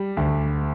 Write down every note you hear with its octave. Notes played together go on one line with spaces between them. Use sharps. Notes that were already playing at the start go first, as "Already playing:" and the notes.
Already playing: G3
D2